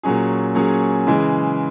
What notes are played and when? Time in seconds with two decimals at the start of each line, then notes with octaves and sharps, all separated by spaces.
0.03 A#2 F#3 C#4 G#4
0.55 A#2 F#3 C#4 G#4
1.07 C#3 E3 G#3